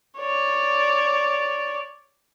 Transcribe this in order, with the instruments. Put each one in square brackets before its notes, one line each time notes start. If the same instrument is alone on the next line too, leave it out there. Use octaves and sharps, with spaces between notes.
[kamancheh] C#5 D5